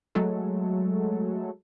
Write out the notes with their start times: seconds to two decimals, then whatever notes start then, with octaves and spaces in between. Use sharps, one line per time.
0.15 F#3 G#3 A3 A4